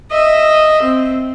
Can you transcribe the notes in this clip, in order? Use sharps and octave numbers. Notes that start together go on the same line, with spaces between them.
D#5 E5
C4